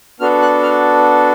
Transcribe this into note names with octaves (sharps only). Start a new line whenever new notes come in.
B3 D4 F#4 A4 F6
F#6
F6